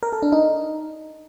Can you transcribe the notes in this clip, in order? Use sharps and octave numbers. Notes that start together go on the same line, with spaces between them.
A#4
A4
D4
D#4